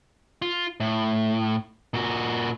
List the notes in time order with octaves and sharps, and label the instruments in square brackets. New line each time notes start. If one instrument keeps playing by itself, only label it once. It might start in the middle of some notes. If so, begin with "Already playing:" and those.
[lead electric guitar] F4
A2
A#2 F#4